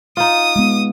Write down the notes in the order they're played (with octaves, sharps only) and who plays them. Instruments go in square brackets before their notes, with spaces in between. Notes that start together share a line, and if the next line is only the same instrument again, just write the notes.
[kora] D#4 F4 [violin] D#6
[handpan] G#3 B3